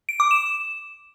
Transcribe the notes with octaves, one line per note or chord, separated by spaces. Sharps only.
D7
D6
E7